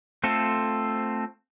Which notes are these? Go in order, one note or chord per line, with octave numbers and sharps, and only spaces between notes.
A3 C4 F4 A4 C5